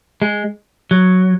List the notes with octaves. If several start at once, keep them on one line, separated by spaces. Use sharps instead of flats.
G#3
F#3